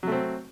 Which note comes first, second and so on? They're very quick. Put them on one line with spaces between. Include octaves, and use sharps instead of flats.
F#3 A3 C4